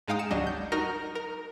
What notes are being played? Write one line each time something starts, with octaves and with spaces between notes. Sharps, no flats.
G#2 G#3 D#4 F5 G5 D#6
C#7 E7
G#1 D2 F#3 G3 D4 D#5
G6
D#4 F#4 A#4 F6 A#6
A#4